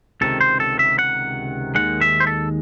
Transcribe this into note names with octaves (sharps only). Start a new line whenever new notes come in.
C#2 C3 D#3 A4
C5
A4
E5
F#5
D#2 D#3 G#3 F#5
E5
C5
A4